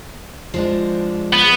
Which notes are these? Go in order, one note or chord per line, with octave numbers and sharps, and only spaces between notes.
F3 G#3 D4
B3